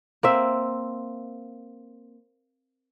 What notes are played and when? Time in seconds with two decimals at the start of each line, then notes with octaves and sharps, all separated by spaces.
0.23 A#3 C4 E5